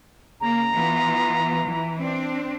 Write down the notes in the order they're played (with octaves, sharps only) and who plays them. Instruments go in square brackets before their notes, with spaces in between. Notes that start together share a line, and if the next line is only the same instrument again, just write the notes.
[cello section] C#3 A#3 [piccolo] A#5
[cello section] E3 B3 F4
E3
C4 D4